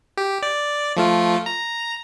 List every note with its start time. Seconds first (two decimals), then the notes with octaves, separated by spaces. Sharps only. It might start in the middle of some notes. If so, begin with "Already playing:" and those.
0.17 G4
0.42 D5
0.96 F3 A3 F4
1.46 A#5